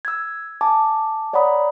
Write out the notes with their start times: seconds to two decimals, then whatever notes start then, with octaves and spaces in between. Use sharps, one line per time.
0.05 E6 G#6
0.61 G#5 A5 D6
1.33 C#5 D5 F#5 A#5 B5 D#6